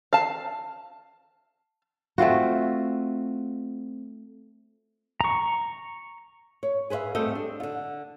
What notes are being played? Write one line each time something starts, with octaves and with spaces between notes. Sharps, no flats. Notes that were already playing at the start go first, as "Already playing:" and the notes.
F5 A5
A3 C4 F4 F#4
A#5 C#6
C#5
G#4 B4 C5 E5 F5
G3 A3 C4 A4 D#5 F5
D4
D3 F4